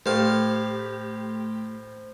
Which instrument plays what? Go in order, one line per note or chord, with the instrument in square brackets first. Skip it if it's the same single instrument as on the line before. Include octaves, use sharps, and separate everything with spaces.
[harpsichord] A2 F5 [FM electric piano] A3 [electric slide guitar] G4 [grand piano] C5